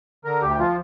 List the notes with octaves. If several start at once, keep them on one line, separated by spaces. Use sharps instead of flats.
D3 A#4
D2 G4
F3 F4